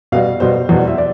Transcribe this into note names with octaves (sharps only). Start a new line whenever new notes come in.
B2 G3 F5
B2 G3 C5
E2 B2 G3
E5
D5